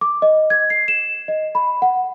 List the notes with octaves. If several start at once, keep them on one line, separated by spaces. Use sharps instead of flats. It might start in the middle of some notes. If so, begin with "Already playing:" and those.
D6
D#5
G#6
C7
E7
D#5
B5
F#5